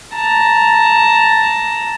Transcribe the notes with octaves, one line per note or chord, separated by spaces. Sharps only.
A5 A#5